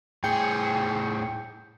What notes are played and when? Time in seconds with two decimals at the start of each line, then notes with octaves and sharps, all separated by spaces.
0.24 A2 G#4 G5 G6 C#7